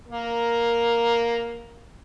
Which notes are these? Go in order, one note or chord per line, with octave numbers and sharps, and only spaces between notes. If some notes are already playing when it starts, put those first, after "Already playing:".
A#3 A#4